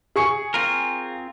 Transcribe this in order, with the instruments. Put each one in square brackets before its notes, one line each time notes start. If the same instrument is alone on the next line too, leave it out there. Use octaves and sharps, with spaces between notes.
[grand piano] G#4 C#6 C#7
[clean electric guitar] C4 F4 A#4